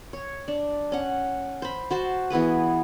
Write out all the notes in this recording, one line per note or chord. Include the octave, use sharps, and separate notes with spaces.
C#5
D4
C#4 F#5
C5 B5
F#4 C5 A5 C6
E3 B3 G#4 B4